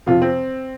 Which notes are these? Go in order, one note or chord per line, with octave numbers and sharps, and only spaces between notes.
F2 C3 F3 F4
C4